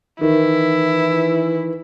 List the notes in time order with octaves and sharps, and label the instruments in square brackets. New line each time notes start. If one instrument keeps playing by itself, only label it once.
[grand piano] D#3 [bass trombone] E3 [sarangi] E4